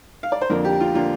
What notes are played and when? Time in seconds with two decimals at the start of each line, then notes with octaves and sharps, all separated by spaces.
0.23 F5
0.32 D5
0.41 C5
0.49 F2 D3 A#3 D4 F4 A#4
0.65 G4
0.80 F4
0.95 D3 A#3 D4 F4